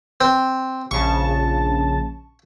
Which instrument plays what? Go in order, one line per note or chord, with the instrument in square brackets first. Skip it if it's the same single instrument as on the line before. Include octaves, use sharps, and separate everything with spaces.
[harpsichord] C4
[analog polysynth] A#1 C#3 A5 [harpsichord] C#6